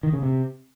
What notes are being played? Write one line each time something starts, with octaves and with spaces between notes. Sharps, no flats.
D#3
C#3
C3